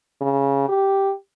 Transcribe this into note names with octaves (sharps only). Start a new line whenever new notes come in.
C#3
G4